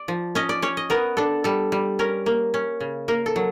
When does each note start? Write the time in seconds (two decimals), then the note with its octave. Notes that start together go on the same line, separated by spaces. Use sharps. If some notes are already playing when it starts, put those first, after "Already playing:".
Already playing: D5
0.08 F3
0.35 C#4 D#5
0.49 D5
0.62 C#4 C#5
0.77 D#5
0.90 B3 A#4
1.17 D4 A4
1.44 G3 A4
1.72 G3
1.99 C#4 A#4
2.26 A#3
2.54 C#4
2.80 C#3
3.08 A#3 A#4
3.26 A4
3.36 F#3